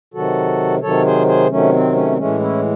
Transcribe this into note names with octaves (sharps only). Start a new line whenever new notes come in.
C3 D#3 F#3 F#4 A4
C3 D#3 F#3 A4 C#5
G#4 C5
G#4 C5
C3 D#3 F#3 A3 C#4
C4
A3 C#4
C4
A2 E3 G#3 A3 C#4
C#4 E4